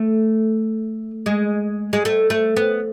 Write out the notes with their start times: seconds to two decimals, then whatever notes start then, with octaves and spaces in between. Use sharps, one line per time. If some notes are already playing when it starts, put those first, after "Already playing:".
Already playing: A3
1.26 G#3
1.93 G#3
2.05 A3
2.30 A3
2.56 B3